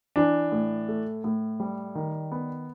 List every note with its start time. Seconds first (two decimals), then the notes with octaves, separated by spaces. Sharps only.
0.16 E3 D4
0.52 A2
0.88 A3
1.24 A2
1.60 G3
1.95 D#3
2.32 B3